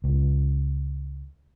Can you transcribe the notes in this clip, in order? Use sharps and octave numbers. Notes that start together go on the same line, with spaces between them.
C#2